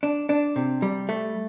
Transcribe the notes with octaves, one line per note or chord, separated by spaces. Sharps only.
D4
D4
C3
G3
A3